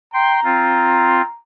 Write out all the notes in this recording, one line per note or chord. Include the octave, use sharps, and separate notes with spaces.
G5 A#5 C6
C4 F4